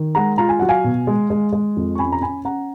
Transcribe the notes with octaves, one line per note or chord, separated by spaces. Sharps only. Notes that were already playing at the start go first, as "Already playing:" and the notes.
Already playing: D#3
G#3 F#5 A#5
F4 A#5
G#5
F#3 F#5
F5 G#5
B2
G#3
G#3
G#3
F2
C#6
C#4 G#5 B5
A#5
C#4 G#5 B5
C#4 F#5 A#5